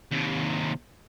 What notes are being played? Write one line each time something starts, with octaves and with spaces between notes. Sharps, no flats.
D#2 C3